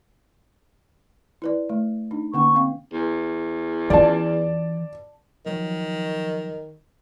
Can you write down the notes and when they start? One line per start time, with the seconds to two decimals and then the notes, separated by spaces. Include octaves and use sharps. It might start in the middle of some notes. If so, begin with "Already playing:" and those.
1.42 E4 B4 D5
1.69 A3
2.11 D4 D#4
2.34 D3 A#3 C#4 C#6
2.55 C4 F5
2.93 E2
3.90 E3 C#4 D5 A5
5.46 D#3 F3 F#3